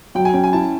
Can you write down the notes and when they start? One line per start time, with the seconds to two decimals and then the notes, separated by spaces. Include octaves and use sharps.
0.15 F#3 G5
0.25 G#5
0.34 C#4 G5
0.44 G#5
0.53 E4 A5